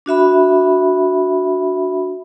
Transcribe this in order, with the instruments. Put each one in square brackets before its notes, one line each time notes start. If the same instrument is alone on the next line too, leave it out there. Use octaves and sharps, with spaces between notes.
[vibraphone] D4 F#4 E5 B5